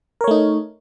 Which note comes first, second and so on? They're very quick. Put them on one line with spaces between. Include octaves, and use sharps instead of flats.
A#4 C#5 A3 D#4